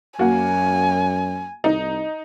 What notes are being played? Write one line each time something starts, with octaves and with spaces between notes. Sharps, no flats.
F#2 A#3 F#4 G#5
C2 D#4